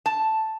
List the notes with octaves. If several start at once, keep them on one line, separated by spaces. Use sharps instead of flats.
A5